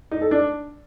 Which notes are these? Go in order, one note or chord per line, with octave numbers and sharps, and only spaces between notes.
D#4
A4
D4